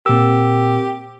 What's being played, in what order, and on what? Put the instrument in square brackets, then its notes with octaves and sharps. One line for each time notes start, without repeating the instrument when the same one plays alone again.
[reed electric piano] A#2 E6 [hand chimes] C4 A#4 [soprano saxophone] G4